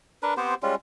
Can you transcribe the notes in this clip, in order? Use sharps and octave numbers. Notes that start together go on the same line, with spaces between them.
D4 A#4 B4
B3 C4 G4 C5
G3 G#3 C#4 F4